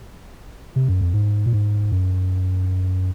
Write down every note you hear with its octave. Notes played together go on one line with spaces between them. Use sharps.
C3
F#2
F2
G#2
A#2
G#2
F#2